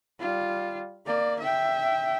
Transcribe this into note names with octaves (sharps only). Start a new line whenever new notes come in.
G3 F4
A#3 D5
E5 G5